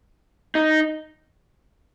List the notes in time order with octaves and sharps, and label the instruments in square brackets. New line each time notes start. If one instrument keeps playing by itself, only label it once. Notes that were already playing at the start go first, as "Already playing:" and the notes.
[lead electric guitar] D#4